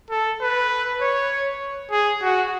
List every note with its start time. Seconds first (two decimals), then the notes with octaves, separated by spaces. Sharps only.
0.10 A4
0.41 B4
1.01 C#5
1.91 G#4
2.22 F#4